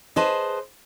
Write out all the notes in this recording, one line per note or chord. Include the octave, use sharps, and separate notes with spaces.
G#4 B4 C5 D#5 A5